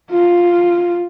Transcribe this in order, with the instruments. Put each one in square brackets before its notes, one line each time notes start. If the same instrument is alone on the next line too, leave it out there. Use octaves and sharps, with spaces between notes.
[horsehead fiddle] F4